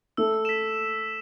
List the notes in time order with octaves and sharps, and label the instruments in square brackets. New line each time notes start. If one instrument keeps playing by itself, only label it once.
[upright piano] A3 [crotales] E6
[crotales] B6 E7